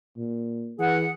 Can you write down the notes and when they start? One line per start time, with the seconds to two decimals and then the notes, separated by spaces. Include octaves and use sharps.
0.17 A#2
0.79 E3 G#4 F#5